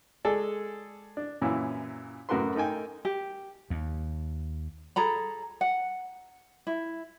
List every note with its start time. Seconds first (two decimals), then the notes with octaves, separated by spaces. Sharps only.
0.25 G#3 G#4 A4 D5
1.17 D4
1.41 F#2 A#2 E3 C#4 E4
2.29 F#2 A2 F#4 A#4 B4 C6
2.55 A3 D#4 A#4 G5 G#5
3.05 G4
3.70 D#2
4.96 G#4 A4 A#5 B5
5.61 F#5
6.67 E4